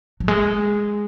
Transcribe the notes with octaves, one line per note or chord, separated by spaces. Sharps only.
F#3
G#3